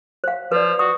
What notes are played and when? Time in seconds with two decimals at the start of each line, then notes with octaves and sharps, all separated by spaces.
0.24 C5 F5
0.52 F3 B4 D5
0.79 F#4 D#6